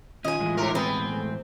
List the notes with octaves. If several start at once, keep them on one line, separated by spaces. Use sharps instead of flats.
D#3 C#4 F4 D#5 G#5
A2 E3 G#3
G#2 A#4
B3 C4 G#5
A3